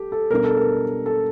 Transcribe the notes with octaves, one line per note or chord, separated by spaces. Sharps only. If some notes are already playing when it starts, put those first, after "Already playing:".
Already playing: G4 A4
A4
B2 G3 B3 D4 A#4
A4
A#4
A4